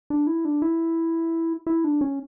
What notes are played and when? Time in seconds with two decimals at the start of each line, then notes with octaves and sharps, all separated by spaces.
0.10 D4
0.27 E4
0.45 D4
0.62 E4
1.67 E4
1.84 D4
2.01 C#4